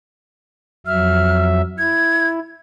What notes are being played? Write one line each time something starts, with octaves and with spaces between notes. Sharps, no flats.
F2 F#3 E5 F6
E4 G#6